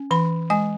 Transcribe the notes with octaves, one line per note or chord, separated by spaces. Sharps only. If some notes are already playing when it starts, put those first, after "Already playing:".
Already playing: C#4
E3 B5
G#3 G#5